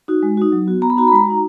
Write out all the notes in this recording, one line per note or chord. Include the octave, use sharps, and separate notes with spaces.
D#4 F#4
G#3
D#4 F#4
F#3
B3 F#4
B3 A#5
B5
D#4 F#4 A#5
B5
G#3 A#5
D#4 F#4